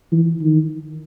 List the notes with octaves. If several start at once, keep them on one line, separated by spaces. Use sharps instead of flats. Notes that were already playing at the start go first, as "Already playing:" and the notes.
E3
D#3